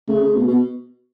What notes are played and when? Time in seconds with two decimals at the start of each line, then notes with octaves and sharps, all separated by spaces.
0.08 C#3 A3
0.22 C#3
0.35 B2
0.48 B2